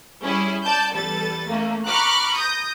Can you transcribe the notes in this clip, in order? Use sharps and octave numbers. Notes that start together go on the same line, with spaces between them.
G3 C#4 E4 G#4
D5 A5 G6
E2 G3 A4 B4 A6
A3 A#3 C#4
A#5 B5 C#6 D6 F6 F#6
D#6 G6 A#6